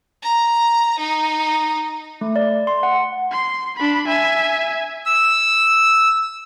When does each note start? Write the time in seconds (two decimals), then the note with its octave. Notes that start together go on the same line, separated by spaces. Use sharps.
0.22 A#5
0.98 D#4
2.21 A3
2.36 D5
2.67 C6
2.83 F#5
3.32 C6
3.77 D4 B5
4.08 E5 G#5
5.06 E6